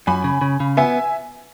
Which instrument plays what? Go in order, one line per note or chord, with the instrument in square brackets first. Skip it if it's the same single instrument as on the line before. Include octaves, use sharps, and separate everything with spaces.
[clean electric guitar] F#2 [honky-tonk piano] G#5 B5
[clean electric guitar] C#3
C#3
C#3
[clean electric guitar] B3 [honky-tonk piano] E5 G#5